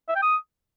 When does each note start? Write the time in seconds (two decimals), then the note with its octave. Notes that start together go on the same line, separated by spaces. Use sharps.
0.09 E5
0.16 G5
0.23 D#6